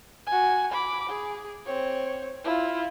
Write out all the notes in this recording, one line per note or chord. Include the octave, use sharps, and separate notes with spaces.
F#4 G#5
B5 D6
G#4
C4 C#5
E4 F4